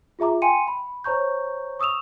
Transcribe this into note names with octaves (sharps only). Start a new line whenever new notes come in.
F4 G#4 E5 A#5 D6
F5 G5 G#5 C6 C#7 D#7
B5
C5 C#5 A#5 C#6 G6
C#6 D#6 E6 E7 F7